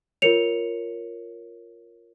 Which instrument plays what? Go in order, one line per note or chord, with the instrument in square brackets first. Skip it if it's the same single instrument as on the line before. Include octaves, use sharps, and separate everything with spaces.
[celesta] F4 A#4 C#5 C#7 F7